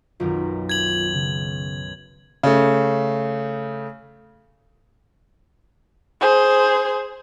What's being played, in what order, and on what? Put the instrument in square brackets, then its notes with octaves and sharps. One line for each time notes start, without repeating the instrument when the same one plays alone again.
[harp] B1 F#2 D#3 [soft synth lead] F4
[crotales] G#6 F#7
[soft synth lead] C#3
[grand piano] C#3 A3
[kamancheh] G#4 C5